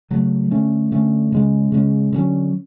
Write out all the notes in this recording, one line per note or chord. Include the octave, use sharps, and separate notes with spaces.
C#3 F#3 A3
D3 A3 C#4
D3 A3 C#4
C#3 G#3 C#4
C#3 G#3 C#4
D3 F#3 C#4